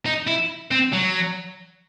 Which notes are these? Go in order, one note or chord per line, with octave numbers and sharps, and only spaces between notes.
D#4
E4
C4
F#3